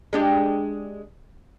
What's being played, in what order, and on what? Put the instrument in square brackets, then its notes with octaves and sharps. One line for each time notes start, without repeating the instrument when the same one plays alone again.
[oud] G#3 D4 G4